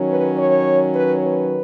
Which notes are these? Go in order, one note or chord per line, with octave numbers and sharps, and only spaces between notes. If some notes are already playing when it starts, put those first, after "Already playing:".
Already playing: D#3 F#3 C#4
B4
C#5
B4
B4